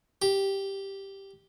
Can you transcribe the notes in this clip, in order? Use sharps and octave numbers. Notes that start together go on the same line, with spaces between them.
G4